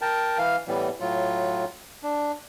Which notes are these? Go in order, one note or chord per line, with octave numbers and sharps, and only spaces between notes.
A#4 G5 A5
E3 F5
A2 E3 G3 B3
A2 F#3 F4
D4